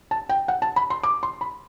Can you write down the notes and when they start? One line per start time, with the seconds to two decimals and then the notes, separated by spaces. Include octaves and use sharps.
0.11 A5
0.29 G5
0.48 F#5
0.62 A5
0.76 B5
0.90 C6
1.03 D6
1.23 C6
1.41 B5